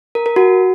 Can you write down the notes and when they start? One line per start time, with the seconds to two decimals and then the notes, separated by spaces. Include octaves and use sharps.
0.15 A#4
0.26 A#4
0.36 F#4